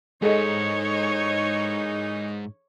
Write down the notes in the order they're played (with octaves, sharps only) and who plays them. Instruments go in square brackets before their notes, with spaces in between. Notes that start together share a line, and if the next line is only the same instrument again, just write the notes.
[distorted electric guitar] G#2 [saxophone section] E3 A#3 D#4 [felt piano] G#4 A4 D#5 [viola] C#5